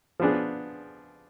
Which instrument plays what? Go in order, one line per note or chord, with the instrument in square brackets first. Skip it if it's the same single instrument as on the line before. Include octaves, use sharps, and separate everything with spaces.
[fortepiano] F3 B3 D4 G#4